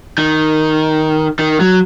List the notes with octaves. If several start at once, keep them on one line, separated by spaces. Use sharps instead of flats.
D#3
D#3
F#3